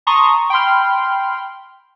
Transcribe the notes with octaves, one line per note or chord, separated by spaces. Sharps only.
A5 A#5 C6 C#6 D#6
G5 B5 C6 F6